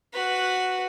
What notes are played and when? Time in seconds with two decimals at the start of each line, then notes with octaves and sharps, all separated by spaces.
0.13 F#4 B4